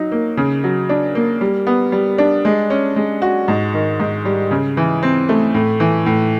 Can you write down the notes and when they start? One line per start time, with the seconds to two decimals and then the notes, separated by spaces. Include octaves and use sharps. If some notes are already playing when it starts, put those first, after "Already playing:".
Already playing: F#3 D#4
0.12 A#3
0.37 C#3
0.64 F#3
0.89 D4
1.15 A#3
1.41 G3
1.67 B3
1.92 G3
2.18 D4
2.45 G#3
2.70 C#4
2.96 G#3
3.22 F#4
3.48 G#2
3.74 D#3
4.00 G#2
4.25 G3
4.51 C#3
4.77 E3
5.03 C4
5.29 A3
5.54 A2
5.80 E3
6.06 A2